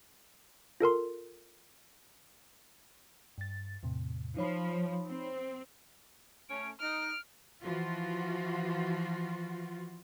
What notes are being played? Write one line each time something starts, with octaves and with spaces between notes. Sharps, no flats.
F4 A4 A#4 C6
G2 A6
E2 A2 C3
F3 D#4 C#5 B5
C4
A3 C#4 D7
D#4 F6 D7
E3 F3 F4 F#4